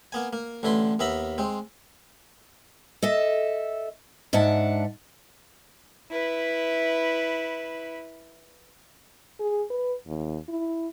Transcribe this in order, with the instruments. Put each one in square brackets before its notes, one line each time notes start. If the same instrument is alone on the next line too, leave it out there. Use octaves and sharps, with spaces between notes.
[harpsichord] A#3 B3 G#5
A#3
A1 D3 E4 B4 C6
D#2 B3 E5 A#5 B5
G#3 C4
[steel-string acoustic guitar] A4 D#5 E5
G#2 D4 E5 F#5 A5
[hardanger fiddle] E4 B4
[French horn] G#4
B4
D#2
E4